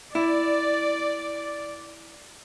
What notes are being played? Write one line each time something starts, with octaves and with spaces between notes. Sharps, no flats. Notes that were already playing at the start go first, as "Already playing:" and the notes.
E4 D5